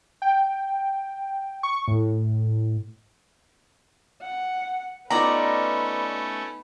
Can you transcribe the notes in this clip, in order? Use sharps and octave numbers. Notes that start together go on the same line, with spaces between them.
G5
C#6
A2
F#5
A3 B3 C#4 D#4 F4 B4 D5 A#5